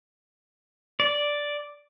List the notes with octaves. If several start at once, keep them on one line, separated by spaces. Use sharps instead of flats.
D5